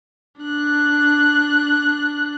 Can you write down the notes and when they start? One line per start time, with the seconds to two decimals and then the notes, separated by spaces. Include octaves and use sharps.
0.41 D4 F#6